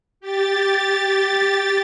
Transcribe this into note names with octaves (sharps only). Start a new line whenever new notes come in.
G4 A6